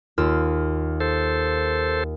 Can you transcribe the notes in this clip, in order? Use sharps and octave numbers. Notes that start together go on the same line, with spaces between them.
D#2 F4 E6
A4 C5